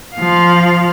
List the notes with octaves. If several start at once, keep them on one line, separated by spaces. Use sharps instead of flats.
F3 F5